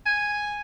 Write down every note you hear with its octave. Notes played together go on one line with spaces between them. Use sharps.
G#5